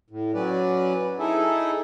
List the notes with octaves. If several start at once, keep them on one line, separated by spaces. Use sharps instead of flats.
A2
F#3 C#4 B4 D5
D#4 E4 G#4 A4 E5